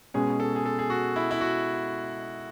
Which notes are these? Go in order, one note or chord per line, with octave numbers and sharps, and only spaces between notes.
B2 G#3 C#4 G#4
A4
G#4
A4
G#4
F#4
E4
E4
F#4